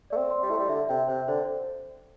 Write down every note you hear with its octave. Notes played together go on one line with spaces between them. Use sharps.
A3 D5
C4
C6
G3
A3 E4
G3
D3 E5
C3 G5
C3 C5
D3 C5